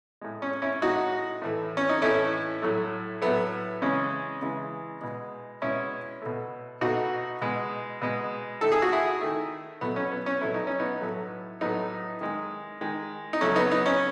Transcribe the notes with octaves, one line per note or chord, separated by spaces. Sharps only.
A2 G#3
C#4
C#4 E4
A2 G#3 D#4 F#4
A2 E3 A3
C#4
D#4
A2 E3 A3 C#4 E4
A2 F#3 A3
A2 F#3 A3 B3
C#3 E3 G#3 C#4
C#3 E3 G#3
B2 G#3
B2 G#3 C#4 E4
B2 A3
B2 A3 D#4 F#4
B2 G#3
B2 G#3
D#3 A3 A4
G#4
F#4
E4 G#4
D#3 A3
B2 F#3 A3 B3
C#4
B3
C#4
B2 F#3 A3 E4
D#4
C#4
B3 D#4
A2 F#3 A3
A2 F#3 A3 B3 D#4
D#3 G#3
D#3 G#3
D#4
C#3 F#3 A3 C#4
B3 D#4
B3 D#4
C#4